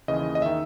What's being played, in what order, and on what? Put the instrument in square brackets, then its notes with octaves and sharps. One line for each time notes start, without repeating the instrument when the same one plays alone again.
[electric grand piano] D#2 C#3 E3 D#5
D#5
D#3 E5